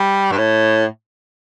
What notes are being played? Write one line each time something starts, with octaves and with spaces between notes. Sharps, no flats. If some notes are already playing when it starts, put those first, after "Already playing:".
Already playing: G3
G2
A2